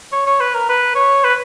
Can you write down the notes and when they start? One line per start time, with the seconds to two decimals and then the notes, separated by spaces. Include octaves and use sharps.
0.12 C#5
0.26 C#5
0.40 B4
0.55 A#4
0.69 B4
0.96 C#5
1.24 B4